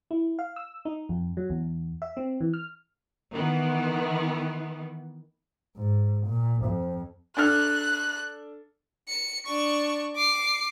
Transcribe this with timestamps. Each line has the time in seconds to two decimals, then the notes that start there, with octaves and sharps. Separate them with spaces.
0.11 E4
0.39 F5
0.56 E6
0.85 D#4
1.09 F2
1.37 F#3
1.50 E2
2.02 E5
2.17 C4
2.41 E3
2.54 F6
3.32 D#3 E3 B3
5.77 G#2
6.26 A#2
6.65 F2
7.37 D4 A4 F6 F#6
9.08 C#7
9.46 D4 C#6
10.16 D6 C7